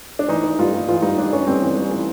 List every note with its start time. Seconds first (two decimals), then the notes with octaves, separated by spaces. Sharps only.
0.19 D4
0.28 E3 D#4
0.44 E3
0.59 G2 F4
0.73 G3
0.89 E3 F4
1.02 G2 D#4
1.17 G2 D4
1.33 G2 C#4
1.47 G2 C4
1.62 E3
1.77 G2 C#4
1.91 E3